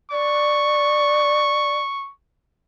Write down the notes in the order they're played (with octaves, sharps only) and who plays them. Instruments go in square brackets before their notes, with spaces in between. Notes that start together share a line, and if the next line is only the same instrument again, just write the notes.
[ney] D5 [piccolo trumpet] C#6